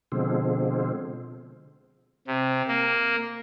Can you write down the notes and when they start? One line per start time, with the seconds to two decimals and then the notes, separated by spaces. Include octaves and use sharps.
0.12 B2 D3 F3 G#3 C4
2.27 C3
2.68 A#3